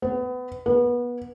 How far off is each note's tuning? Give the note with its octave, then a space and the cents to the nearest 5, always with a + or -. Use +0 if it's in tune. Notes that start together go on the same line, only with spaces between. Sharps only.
B3 +25
B3 -25